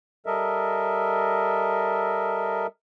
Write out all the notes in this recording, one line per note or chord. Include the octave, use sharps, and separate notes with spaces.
G3 A4 A#4 D#5 E5